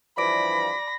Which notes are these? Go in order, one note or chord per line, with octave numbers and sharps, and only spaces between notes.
G2 E3 F3 D5 B5 D6 A#6 D7